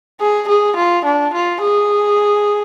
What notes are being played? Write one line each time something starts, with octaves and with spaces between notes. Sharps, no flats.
G#4
G#4
F4
D4
F4
G#4